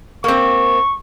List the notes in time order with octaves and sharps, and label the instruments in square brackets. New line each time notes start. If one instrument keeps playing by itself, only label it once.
[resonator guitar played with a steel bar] A#3 C4 [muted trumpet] C#6